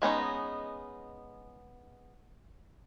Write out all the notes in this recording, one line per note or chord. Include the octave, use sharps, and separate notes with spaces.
G#3 B3 C#4 D#4